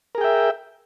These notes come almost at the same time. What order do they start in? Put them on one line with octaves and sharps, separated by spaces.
A#4 G#4 G5 E5